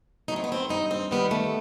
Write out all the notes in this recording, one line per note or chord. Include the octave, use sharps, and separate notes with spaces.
F#3 A3 D#4
C4
B3
C4
G2 D#4
C4
D#3 G3 B3
A3